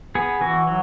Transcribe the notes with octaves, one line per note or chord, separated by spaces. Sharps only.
B3 G#4
E3 F#4
F#3